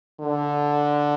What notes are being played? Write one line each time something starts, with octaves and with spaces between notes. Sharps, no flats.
D3